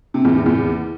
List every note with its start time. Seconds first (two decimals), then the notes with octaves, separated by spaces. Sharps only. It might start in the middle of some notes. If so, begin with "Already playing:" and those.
0.14 C3
0.25 E2
0.36 C3
0.46 E2